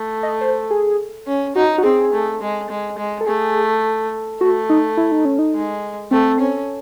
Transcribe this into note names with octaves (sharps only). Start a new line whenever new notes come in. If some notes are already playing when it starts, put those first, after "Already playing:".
Already playing: A3
D#5
C5
G#4
C#4
D#4 F#4
F#4
C4 G#4
A3
G#3
G#3
G#3
A4
A3 G#4
A3 F#4
D#4
E4
D#4
C#4
D#4
G#3
A3 C4
C#4